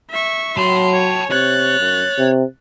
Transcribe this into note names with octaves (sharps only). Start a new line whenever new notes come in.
E5 C#6
F#3 A5 B5 C6
C#5
C3 C#5 F#6 A6
F#2
C3